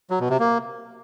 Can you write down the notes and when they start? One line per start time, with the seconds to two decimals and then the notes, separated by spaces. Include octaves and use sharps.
0.10 F#3
0.20 B2
0.30 C3
0.39 A#3